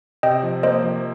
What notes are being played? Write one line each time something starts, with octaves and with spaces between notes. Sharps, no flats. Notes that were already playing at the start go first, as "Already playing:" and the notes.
C3 D#5 G5
F3
A#3 C5 D#5
F3